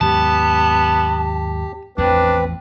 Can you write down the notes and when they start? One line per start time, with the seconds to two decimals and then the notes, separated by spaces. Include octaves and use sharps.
0.01 D#2 G#2 F#3 B3 G4 A5
1.98 A1 E2 F3 C4 D4 B4